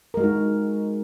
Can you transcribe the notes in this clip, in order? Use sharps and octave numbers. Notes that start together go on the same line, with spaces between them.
G#3 D#4 F#4 A#4